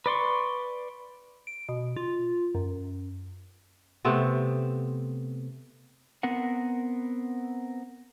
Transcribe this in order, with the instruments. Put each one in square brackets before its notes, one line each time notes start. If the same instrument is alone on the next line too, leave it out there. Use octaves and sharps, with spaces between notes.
[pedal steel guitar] B4 D5 C6 C#6
[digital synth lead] D7
B2
F4
F#2
[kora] C3 A3 B3 C4
[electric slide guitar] B3 C4 A#4 F#5